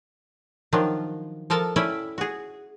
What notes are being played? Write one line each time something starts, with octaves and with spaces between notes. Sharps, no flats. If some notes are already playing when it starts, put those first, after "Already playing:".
D#3 F3 F#3 D4 F4
F3 A4 A#4 A5
C#4 E4 D5 G5
F#4 G#4